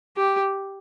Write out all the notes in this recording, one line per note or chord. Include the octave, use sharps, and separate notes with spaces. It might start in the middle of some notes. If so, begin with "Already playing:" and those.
G4